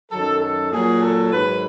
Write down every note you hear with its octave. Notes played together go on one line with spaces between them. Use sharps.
F#2 D#3 F#3 A4
A4
A#2 F#3 G#4
A4
G#2 D#3 F#3 B4